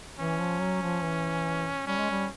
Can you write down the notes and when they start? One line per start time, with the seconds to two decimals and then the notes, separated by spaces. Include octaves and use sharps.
0.18 E3 C#4
0.39 F3
0.60 F#3
0.82 F3
1.03 E3
1.87 G3 C#4
1.99 G#3
2.11 G3